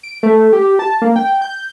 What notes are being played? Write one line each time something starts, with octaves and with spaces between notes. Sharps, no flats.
D7
A3
G4
A5
A#3
G5
G6